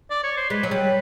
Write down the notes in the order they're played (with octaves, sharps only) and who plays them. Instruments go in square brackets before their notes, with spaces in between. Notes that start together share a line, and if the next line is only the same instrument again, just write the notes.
[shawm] D5
C#5
C5
[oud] G#3 [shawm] B4
[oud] F#3
G3